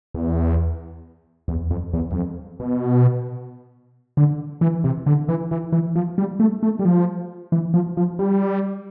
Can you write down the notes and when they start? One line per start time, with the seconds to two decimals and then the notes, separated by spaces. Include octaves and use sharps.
0.14 E2
1.48 E2
1.70 F2
1.93 E2
2.11 G2
2.15 F2
2.60 B2
4.17 D3
4.61 E3
4.84 C3
5.06 D3
5.29 E3
5.51 E3
5.72 E3
5.96 F3
6.18 G3
6.40 A3
6.63 A3
6.79 G3
6.85 F3
7.52 E3
7.74 F3
7.97 F3
8.19 G3